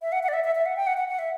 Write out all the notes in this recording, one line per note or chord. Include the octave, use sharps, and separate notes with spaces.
E5
F#5
F#5
D5
E5
E5
E5
F#5
G5
F#5
F#5
F#5
E5